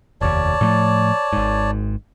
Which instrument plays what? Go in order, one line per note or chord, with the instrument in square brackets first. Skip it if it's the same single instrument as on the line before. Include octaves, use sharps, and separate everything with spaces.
[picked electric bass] F1 D#2 [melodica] C#5 D5 A5
[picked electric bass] A2 F3 A3
G#1 G#2